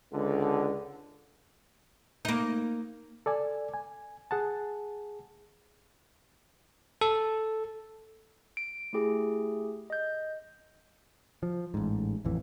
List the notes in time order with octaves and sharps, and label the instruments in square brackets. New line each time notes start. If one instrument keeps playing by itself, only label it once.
[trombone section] C#2 D3
[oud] A#3 D#4
[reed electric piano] A4 D5 G#5
G#5
G#4 F#5 A5
[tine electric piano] A4
[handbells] D7
A3 E4 G4 G#4
D#5 G6
[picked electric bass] F3
A1 G#2
A1 F2 E3